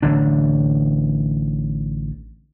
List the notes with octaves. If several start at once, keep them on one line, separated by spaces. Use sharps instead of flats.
A1 D3 D4